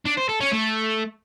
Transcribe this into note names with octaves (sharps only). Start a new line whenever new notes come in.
D4
C5
A4
C#4
A3